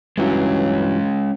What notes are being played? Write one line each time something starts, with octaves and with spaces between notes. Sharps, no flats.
G2 E3 F#3 G#3 C#4